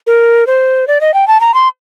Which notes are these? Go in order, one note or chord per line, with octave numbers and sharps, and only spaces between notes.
A#4
C5
D5
D#5
G5
A5
A#5
C6